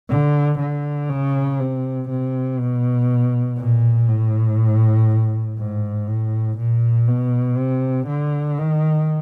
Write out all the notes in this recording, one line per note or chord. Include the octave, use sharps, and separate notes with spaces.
D3
D3
C#3
C3
C3
B2
A#2
A2
G#2
A2
A#2
B2
C3
D3
D#3